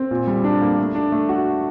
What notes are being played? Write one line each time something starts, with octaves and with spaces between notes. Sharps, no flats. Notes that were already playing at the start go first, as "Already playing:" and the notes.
Already playing: C4
A#2
G3
D4
A#3
A3
D4
A3
F#4